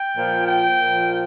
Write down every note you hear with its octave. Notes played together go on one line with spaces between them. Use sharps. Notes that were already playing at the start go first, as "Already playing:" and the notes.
Already playing: G5
A#2 F3
G5
A#2 F3